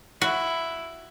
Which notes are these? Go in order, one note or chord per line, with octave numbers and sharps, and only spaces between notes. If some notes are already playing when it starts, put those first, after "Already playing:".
E4 F#4